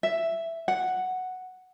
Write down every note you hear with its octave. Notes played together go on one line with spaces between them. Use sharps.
E5
F#5